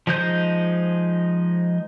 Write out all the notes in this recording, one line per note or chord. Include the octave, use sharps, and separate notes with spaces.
F3 G#3 D#4 C5 G6